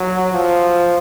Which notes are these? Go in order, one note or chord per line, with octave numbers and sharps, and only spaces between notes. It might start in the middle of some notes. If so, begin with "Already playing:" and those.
Already playing: F#3
F3